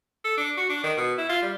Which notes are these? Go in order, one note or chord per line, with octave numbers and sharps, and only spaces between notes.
A4
D4
F#4
D4
D#3
B2
E4
F4
G3